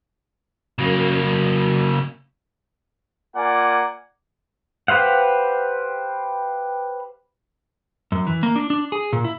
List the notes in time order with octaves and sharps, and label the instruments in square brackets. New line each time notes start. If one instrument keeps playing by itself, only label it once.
[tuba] F#2 [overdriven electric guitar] C#3 A#3
[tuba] F#3
[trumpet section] A#3 F4 D5 F#5 G#5
[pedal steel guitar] G4 B4 C5 F5 F#5
[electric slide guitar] F#2
E3
A#3
D4
D4
G#4
A#2
E4